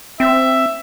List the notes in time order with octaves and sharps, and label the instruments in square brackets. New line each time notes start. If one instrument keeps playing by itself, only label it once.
[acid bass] C4 [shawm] E5